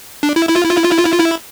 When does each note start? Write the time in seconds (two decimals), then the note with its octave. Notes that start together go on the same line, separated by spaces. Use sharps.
0.23 D4
0.36 E4
0.49 E4
0.56 F4
0.64 E4
0.70 F4
0.77 E4
0.85 F4
0.92 E4
0.98 F4
1.06 E4
1.13 F4
1.19 E4